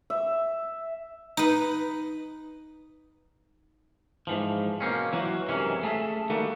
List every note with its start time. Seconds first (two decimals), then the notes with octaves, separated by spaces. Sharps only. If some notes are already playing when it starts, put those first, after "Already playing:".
0.10 E5
1.37 D#4 B4
4.27 G#2 E3 F3
4.80 B2 A#3 C4 C#4
5.13 E3 F#3 F#4
5.48 F#2 C3 D#3 E3 G#3 C#4
5.83 A3 G#4 A4 E5
6.30 D#3 G3 A3 A#3 F#4